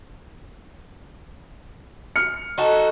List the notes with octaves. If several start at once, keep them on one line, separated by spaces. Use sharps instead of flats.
F6 C#7
D#4 F#4 A4